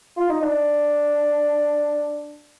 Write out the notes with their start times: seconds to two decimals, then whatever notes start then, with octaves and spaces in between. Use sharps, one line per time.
0.17 F4
0.29 D#4
0.42 D4